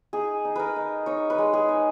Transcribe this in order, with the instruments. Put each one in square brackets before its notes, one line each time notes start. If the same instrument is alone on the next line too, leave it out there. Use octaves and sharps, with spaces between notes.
[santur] D#4 G#4
D#4
A#4 B4
D#4
D#4 C#5
B4
G#3
G#4
D#4